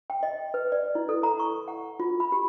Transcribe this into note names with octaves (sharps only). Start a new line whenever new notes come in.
G5
D#5
B4
D5
E4
A4
A#5
C#6
F#5
F4
B5
G4